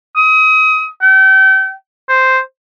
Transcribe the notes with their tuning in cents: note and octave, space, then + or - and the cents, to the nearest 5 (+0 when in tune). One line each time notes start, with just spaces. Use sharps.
D#6 +30
G5 -35
C5 -5